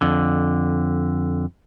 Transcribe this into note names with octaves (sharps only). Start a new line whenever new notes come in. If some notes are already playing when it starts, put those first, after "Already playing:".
F2 D3